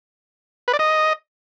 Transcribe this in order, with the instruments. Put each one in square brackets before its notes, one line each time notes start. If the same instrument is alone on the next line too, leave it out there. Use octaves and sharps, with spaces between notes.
[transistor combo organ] B4
D5
D#5